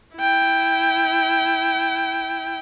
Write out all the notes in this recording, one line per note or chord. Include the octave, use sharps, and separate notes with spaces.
E4 G5